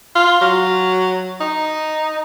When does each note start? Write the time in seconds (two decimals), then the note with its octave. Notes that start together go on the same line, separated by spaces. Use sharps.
0.15 F4
0.41 F#3
1.40 D#4